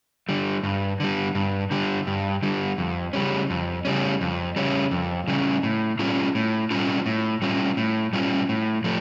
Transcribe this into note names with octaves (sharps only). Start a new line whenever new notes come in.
D3 G3
G2
D3 G3
G2
D3 G3
G2
D3 G3
F2
C#3 G3 C#4
F2
C#3 G3 C#4
F2
C#3 G3 C#4
F2
C#3 G3 C#4
A2
G3 C#4 F4
A2
G3 C#4 F4
A2
G3 C#4 F4
A2
G3 C#4 F4
A2
F3 A3